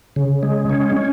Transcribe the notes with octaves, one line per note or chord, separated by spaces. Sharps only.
C#3
G#3
C#4
C#4